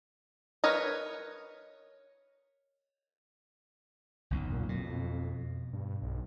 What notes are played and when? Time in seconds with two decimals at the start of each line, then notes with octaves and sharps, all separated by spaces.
0.64 A#4 B4 C#5 D#5
4.30 F#1 B1 E2
4.52 A#2
4.69 F2 B2
5.73 G2
6.02 B1